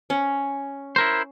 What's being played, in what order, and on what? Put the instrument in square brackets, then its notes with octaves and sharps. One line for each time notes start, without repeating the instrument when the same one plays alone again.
[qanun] C#4
[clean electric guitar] E4 A#4 C5